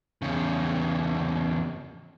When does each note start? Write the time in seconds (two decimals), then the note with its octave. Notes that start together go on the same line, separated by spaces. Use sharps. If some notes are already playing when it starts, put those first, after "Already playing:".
0.22 E2 C#3